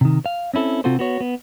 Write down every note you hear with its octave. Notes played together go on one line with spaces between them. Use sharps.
C3 D#3
F5
C4 C#4 E4 A4
C3 C4 F4 F#4 A4 C5
B3 F#4 C#5
B3